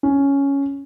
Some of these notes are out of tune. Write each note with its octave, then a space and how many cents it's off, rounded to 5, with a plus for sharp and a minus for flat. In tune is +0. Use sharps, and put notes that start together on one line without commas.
C#4 +5